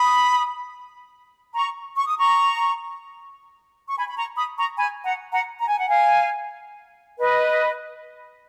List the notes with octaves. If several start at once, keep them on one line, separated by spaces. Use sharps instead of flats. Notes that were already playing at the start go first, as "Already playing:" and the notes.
Already playing: B5 D#6
A#5 C#6
C#6
D#6
A#5 C#6
C#6
G#5 B5
B5
A#5 C#6
B5 D#6
A#5 C#6
G#5 B5
F#5 A#5
F#5 A#5
A#5
G#5
F#5
F5 G#5
B4 D#5